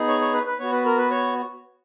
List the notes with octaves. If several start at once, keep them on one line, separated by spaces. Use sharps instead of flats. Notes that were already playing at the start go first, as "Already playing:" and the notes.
Already playing: B3 D#4 G#4
C#5
C#5
B4
B4
B3 F#4 C#5
B4
A#4
B4
C#5